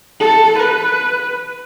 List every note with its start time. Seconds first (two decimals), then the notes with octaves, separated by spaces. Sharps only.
0.21 A4
0.59 B4